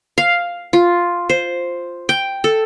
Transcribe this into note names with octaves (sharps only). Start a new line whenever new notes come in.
F5
F4
C5
G5
A4